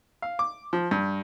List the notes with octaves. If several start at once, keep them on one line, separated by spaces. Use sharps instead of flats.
F5
D6
F3
G2